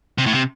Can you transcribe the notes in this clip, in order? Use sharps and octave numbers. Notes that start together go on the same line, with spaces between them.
C3
A2
C3